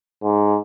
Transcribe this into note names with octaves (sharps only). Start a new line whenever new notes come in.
G#2